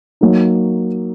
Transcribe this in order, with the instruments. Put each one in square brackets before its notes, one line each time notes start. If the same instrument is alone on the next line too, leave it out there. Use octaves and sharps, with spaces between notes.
[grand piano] F#3 A#3 D#4